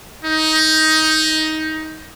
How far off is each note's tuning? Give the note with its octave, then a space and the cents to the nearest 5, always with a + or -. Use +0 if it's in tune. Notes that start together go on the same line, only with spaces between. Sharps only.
D#4 +15